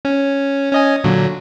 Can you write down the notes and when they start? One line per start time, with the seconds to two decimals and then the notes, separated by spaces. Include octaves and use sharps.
0.05 C#4
0.72 C#4 D#5 G#5
1.04 A#2 D3 F#3